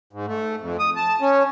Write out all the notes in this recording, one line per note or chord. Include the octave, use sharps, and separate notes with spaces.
G#2
A3
F2
D#6
A5
C#4